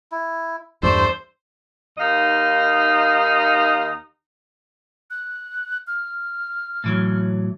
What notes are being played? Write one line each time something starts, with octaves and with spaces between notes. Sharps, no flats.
E4
E2 G2 A3 C5 D5 E6
D#2 D#4 D#5 F5
F#6
F6
A2 E3 F#3